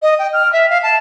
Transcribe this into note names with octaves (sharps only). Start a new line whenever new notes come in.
D#5
G5
F6
E5
F5
A5